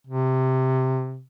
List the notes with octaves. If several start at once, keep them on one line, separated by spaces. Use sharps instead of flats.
C3